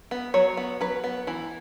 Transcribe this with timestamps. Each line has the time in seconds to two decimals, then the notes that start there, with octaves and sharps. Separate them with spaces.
0.11 B3
0.34 F#3 C#5
0.57 B3
0.81 F#3 B4
1.04 B3
1.27 E3